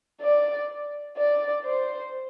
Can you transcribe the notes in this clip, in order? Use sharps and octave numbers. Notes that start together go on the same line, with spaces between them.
D5
D5
C5